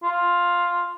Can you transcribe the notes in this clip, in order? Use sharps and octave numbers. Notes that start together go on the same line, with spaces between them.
F4